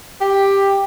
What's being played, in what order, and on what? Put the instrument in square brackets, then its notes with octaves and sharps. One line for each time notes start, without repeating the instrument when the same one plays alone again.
[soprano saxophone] G4